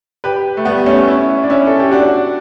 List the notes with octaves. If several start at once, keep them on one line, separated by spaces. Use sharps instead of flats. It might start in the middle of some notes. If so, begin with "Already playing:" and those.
G4 B4
A3
G3 B3
A3 C#4
C#4 E4
D4
C#4 E4
A4
G4
D4 F#4